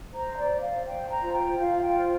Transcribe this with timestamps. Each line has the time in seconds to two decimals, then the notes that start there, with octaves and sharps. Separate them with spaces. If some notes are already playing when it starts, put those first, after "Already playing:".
0.13 C5 A#5
0.38 D5
0.50 C5
0.61 F5
0.86 C5 G5
1.10 A#5
1.21 F4
1.34 G5
1.58 F4 F5
1.82 G5
1.95 C5